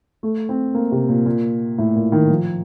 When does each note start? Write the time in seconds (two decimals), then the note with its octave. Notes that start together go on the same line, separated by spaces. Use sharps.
0.23 A3
0.49 C4
0.74 A#3
0.92 C3
1.09 A#2
1.26 A#2
1.78 A2
1.96 A#2
2.12 D#3
2.30 F3